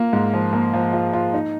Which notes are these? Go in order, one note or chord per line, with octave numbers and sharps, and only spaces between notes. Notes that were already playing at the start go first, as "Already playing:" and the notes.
Already playing: A#3 F4
G#2
F3
A#3
F3
F4
F4
D#4